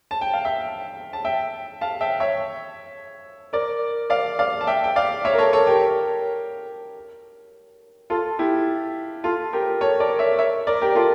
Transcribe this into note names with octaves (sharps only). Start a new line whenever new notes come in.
A5
G5
F5
E5 G5
A5
E5 G5
F5 A5
E5 G5
C#5 E5
A#4 D5
D5 F5
D5 F5
A5
E5 G5
G5
D5 F5
C#5 E5
A#4
A4 C#5
A4 C#5
G4 A#4
F4 A4
E4 G4
F4 A4
G4 A#4
A4 C#5
A#4 D5
C#5 E5
C#5 E5
A#4 D5
G4 A#4
F4 A4